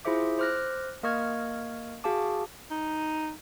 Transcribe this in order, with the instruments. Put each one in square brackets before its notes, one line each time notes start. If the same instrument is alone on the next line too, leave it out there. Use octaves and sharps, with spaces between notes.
[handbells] E4 F4 G#4 C5 E5 D6
C5 D6 F6 F#6 A#6
A#3 A#4 D#5 C#6 F6 G#6
F#4 G#4 F5 A5 D6
[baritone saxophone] D#4